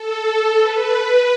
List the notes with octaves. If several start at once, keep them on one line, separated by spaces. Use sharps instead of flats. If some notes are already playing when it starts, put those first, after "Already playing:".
Already playing: A4
B4